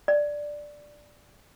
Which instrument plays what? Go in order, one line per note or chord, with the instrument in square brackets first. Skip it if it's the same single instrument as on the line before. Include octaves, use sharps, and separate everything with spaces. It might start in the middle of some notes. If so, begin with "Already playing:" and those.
[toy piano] D5